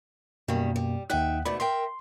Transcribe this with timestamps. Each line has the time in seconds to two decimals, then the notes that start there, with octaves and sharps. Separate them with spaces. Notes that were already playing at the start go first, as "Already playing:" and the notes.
0.48 F#2 B2 D#3 G3 A#3
0.76 G3
1.10 D#2 D#4 E5 F#5 G5 F#6
1.45 G#2 B2 A3 D5 B5
1.60 A#4 E5 G5 C6